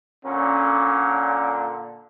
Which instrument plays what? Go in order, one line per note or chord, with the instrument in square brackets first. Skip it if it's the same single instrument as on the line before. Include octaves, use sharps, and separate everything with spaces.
[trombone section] A#2 D3 [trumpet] C#4